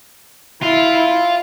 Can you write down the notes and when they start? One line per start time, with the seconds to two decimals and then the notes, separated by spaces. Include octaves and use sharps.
0.62 E4 F4